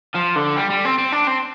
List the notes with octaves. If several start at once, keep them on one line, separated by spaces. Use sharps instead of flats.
F3
D3
G3
G3
C4
C4
D4
C4